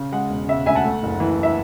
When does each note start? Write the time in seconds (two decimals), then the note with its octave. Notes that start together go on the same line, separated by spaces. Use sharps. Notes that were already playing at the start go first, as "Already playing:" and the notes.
Already playing: C#3
0.12 G#3 F#5
0.30 E1
0.48 C#3 E5
0.66 D2 E5 G#5
0.75 F#5 A5
0.84 A3
1.03 F#1
1.20 E3
1.43 E5